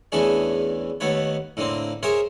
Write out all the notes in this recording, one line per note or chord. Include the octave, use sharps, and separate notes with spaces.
E2 E3 A3 C#4 D4 G#4
D#2 A3 B3 B4 C#5
A2 D3 A#3 C4
G#4 A#4 C5 C#5 E5 G5